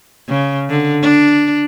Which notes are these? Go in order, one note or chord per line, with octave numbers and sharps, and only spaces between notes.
C#3
D3
D4